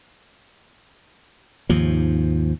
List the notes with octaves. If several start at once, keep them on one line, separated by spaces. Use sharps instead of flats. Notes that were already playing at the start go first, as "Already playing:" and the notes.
D#2 G#2 F3